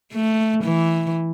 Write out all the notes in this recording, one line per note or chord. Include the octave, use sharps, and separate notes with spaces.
A3
E3